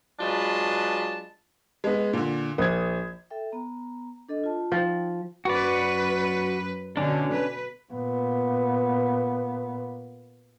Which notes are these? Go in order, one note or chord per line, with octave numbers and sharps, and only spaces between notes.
F#3 G#3 D4 F4 B4 A5
G#3 B3
A#2 D3
A#1 D#6 G#6
A4 E5 G5
B3 A#5
D4 A4 D#5
F4 A5
F3 D#4 G5
F#2 F#4 B4 D5
B2 D3 C#4 D4
B4
A#2 B3